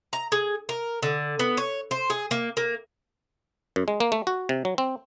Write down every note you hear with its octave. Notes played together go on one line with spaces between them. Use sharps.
A#5
G#4
A#4
D3
B3
C#5
C5
G#4
A#3
A#3
F#2
G#3
A#3
A3
F#4
C3
F#3
C4